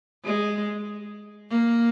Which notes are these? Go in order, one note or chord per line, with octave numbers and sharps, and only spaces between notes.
G#3
A#3